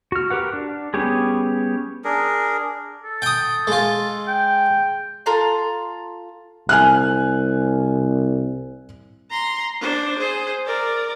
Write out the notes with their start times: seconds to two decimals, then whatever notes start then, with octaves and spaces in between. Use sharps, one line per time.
0.12 F#4 F6
0.30 G4 A#4 B4 F#5
0.53 D4
0.94 G3 B3 C#4 G4 G#4
2.04 D4 G#4 A#4
3.04 A4
3.22 G5 D#6
3.67 G#3 F4
4.28 G5
5.26 F4 A4 A#5 C6
6.69 C2 G#5 F6 F#6
9.30 A#5 C6
9.81 D4 C5
10.18 G#4 C5
10.66 A#4 D5